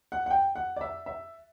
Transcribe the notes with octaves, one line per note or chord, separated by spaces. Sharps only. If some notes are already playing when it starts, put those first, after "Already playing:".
F#5
F#5
G5
F#5
D5
E5
E5